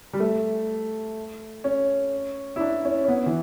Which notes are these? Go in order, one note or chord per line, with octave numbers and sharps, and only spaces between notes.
G3
A3
C#4
E4
D4
C#4
C#4
B3
E3